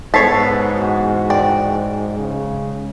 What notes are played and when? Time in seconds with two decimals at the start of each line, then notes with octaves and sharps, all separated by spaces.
0.14 G#2 B3 A4 C#5 A6 B6 C7
0.75 E2 F#4
1.30 D5 G5
2.19 C#3 G#3